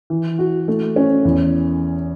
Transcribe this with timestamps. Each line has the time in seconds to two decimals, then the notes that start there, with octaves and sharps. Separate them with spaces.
0.10 E3
0.39 F#4
0.68 A3
0.96 C#4
1.25 E2